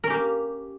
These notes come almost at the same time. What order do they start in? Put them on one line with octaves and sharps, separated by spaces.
A#4 C#4 G4 A#3